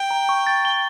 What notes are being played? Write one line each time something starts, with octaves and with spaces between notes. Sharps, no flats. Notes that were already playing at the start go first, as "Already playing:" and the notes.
Already playing: G5
A#5
C#6
A6
G7